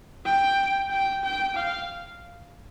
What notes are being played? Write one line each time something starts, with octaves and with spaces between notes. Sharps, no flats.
G5
G5
G5
F5